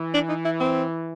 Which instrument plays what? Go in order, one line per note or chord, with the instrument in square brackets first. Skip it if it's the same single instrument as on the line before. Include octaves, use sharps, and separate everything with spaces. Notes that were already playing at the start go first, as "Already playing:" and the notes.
Already playing: [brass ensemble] E3
[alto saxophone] D4
D#4
E4
C4